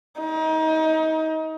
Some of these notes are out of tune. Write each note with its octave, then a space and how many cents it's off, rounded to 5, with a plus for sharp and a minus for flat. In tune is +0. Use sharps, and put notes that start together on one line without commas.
D#4 +30